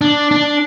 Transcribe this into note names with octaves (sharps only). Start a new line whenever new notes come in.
D4
D4